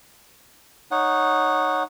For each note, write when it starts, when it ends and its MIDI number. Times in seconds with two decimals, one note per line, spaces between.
0.91 1.83 63
0.91 1.83 73
0.91 1.83 78